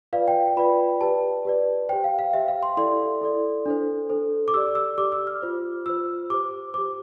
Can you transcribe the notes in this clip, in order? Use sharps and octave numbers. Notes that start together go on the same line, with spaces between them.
F4 B4 D5 F5
G5
F4 B4 D5 B5
G4 B4 D5 A5
G4 B4 D5
G4 C5 G5
F5
F5
G4 C5 E5
F5
C6
E4 A4 D5 C6
E4 A4 D5
D4 A4 C5
D4 A4 C5
D6
G4 D5 E6
E6
G4 D5 D6
E6
F6
F4 C5
F4 C5 E6
G4 C5 D6
G4 C5 D6